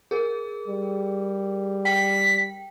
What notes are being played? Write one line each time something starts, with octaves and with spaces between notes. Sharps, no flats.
G#4 A#4
G3
G5 B6